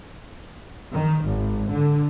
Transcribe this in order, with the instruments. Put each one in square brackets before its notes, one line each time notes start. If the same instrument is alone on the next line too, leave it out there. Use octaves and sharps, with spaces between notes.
[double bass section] D#3
G#1
D3